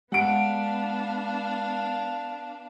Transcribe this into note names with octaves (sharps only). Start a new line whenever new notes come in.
G#3 B3 D4 F5 F#5 D7